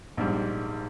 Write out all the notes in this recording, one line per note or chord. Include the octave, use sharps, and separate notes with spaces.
A#1 G#2 G3